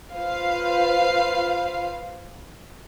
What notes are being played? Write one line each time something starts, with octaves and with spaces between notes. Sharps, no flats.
F4 B4 C5 F5